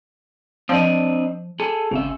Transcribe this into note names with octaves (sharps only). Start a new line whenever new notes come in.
F3 C4 D4 D#5
G#4 A4
G#1 C#3 E5